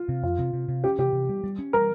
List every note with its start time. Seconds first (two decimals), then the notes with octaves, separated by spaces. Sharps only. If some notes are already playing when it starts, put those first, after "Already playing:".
Already playing: F4
0.09 C3
0.23 F2 F4
0.39 C3
0.53 C3
0.68 C3
0.84 C#4 G4
0.99 C3 G4
1.13 C3
1.29 G3
1.44 G3
1.59 C#4
1.73 G3 A#4